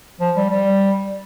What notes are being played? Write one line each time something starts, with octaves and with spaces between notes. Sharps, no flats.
F3
G3
G3